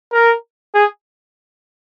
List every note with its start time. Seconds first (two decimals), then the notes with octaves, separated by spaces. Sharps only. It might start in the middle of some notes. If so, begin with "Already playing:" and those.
0.12 A#4
0.75 G#4